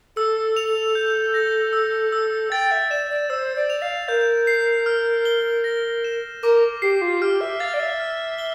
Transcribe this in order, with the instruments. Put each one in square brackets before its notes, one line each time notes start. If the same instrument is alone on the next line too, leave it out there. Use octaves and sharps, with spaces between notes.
[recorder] A4 [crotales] E6
[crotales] F7
G6
A#6
E6
E6
[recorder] G5 [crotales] A6
[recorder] E5
[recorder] D5 [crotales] E7
[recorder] D5
[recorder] C5 [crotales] E6
[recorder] D5
[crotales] F7
[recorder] F5
[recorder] A#4 [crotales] G6
[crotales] C7
F6
G7
A#6
E7
[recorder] A#4 [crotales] D6
[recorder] G4 [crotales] C7
[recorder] F4
[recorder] G4 [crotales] F6
[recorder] E5
[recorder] F5 [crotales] A6
[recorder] D5
E5
[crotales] F6
G7